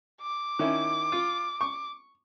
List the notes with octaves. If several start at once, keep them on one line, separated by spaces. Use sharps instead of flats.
D6
D#3 C#4 E4
F4
C#6